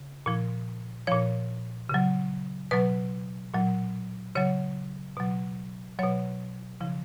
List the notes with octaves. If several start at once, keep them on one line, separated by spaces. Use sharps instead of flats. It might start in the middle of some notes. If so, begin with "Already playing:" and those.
Already playing: C#3
A#2 F3
A#2 F3 C#5
C#3 F#3
B2 F#3 B4
A#2 F#3
C#3 F#3 C#5
B2 F#3
B2 F#3 C#5
C#3 F3